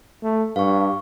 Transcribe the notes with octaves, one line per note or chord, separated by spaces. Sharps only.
A3
G2 F5 C#6